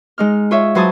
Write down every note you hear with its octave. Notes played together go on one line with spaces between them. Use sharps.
G#3 D#4 F6
F4 C#5 E5
F#3 B4 C5 G#5 A5 D#6